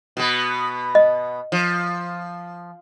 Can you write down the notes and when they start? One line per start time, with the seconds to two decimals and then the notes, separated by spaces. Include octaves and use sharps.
0.17 B2 B3
0.95 D#5
1.52 F3